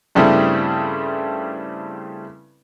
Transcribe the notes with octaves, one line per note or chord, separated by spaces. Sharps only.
G2 C#3 G3 A3 C4 E4